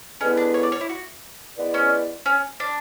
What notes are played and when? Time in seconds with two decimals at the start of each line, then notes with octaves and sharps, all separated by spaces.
0.21 D3 G#3 B3 C#4 E4 B4
0.37 D4
0.54 C#5
0.63 D5
0.72 C#5
0.81 E4
0.89 F#4
1.57 G#3 B3 E4 B4 D5
1.74 C#4
2.26 C#4
2.60 D4